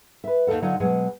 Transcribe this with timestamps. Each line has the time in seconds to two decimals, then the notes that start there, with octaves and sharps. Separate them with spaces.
0.24 B4 E5
0.47 D#2 C3 A4 F#5
0.62 D3 F#3 D#4 F4 C#5
0.80 B2 F#3 G#3 F#4 G#4